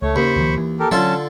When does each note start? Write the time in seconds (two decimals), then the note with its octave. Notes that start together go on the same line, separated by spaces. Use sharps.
0.02 C#2 A3 C#5
0.16 D#2 C#3 C5 B5 C#6
0.36 C#2 D#3 F3
0.57 E3
0.80 G4 A4 A#4
0.92 D3 F#3 C#4 F4 A4 A5